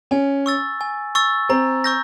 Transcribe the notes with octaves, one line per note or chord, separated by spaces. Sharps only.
C#4 G#5
C#6 E6 A6
G#5
C#6 E6 A6
C4 A#5
C#6 E6 G6 A#6